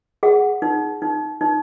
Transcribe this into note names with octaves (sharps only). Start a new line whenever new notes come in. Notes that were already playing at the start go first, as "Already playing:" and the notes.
G#4 F#5
D#4
D#4
D#4